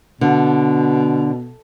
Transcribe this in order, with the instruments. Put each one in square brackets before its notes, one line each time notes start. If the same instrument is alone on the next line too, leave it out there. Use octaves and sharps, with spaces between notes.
[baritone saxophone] B2 [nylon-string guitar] D3